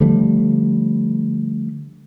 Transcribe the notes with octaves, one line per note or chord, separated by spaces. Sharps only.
D3 F3 G3 A3